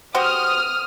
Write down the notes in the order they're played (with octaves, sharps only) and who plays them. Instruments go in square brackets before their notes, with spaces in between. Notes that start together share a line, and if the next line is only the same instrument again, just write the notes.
[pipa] F#4 G4 C5 [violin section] D#6 F6